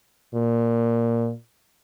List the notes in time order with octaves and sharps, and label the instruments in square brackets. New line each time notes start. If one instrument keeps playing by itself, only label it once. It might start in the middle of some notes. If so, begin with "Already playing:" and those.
[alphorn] A#2